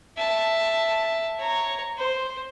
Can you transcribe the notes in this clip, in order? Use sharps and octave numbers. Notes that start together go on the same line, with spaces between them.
E5 A5
C#5 A#5
C5